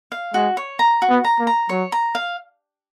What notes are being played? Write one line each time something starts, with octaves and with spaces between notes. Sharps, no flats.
F5
G#3 F#4
C#5
A#5
F#4
B3
A#5
A#3
A#5
F#3 C#5
A#5
F5